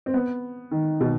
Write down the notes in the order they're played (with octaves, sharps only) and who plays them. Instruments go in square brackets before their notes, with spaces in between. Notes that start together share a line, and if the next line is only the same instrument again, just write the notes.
[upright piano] C4
B3
D#3
B2